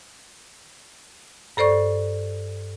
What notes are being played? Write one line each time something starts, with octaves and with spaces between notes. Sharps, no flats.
G2 A4 C5 D5 C#6